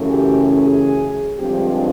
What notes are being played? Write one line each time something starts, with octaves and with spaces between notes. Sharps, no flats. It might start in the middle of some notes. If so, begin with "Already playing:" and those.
Already playing: F#2 C#3 E3 A3 C#4
G4
G#4
G2 D3 F3 G#3 C4 G4